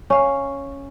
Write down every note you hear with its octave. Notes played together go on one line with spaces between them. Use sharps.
C#4 F5